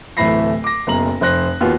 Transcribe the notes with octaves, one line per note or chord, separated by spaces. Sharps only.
D1 E3 A3 B5 A#6 C7
D6 A#6
F#1 B1 A#5 F#7
F1 C5 F#6 A#6
D#2 B3 F4 F#4